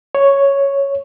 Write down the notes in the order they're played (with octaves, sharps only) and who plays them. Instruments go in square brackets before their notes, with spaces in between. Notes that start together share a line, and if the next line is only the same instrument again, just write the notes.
[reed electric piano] C#5